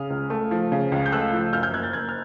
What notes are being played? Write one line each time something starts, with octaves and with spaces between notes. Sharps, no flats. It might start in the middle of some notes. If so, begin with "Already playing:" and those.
Already playing: C#3 D#6 F6
C#2
A3
F3
C#3
C#2
G6
A3 E6 F#6
F3
F#2 F6 G6
F6 G6
F#1 F#6 G#6
G6 A6
F#1 F#6 G#6
F6